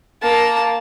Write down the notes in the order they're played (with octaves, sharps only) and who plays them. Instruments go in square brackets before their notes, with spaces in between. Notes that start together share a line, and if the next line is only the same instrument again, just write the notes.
[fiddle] A#3 A5